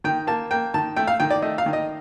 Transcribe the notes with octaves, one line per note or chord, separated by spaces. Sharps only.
D#3 G5
A#3 A5
A#3 G5
D#3 A5
A3 G5
F5
D#3 G5
D5
A3 D#5
F5
D#3
D#5